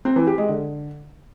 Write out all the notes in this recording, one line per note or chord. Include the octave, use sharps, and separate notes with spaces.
C4
E3
G4
G#3
D3